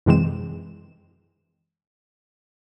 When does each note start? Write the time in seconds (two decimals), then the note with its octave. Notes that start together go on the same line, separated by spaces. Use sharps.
0.06 F#2 C3 E3 G#3 C4 E7